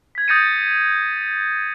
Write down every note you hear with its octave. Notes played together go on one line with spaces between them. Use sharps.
G#6 B6
D#6 G6 A6 A#6 C#7 D#7